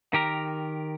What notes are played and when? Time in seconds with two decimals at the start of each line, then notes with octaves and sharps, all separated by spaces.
0.13 D#3 G4 A#4